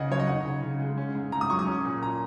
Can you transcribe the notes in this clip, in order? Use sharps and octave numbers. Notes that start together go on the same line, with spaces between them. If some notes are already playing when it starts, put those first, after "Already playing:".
Already playing: C#3 A#3 D#4 D#5 F#5
F#3 C#5
D#5
D#4 F#5
C#3
C#3
G#3
C#4
G#2
G#2 A#5
D#6
F#3 C#6
D#6
C#4
A#2
A#2 A#5